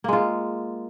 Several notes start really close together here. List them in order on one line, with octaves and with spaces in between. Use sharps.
A#3 G#3 F4